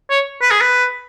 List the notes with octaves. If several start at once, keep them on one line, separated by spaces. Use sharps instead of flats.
C#5
B4
G#4
B4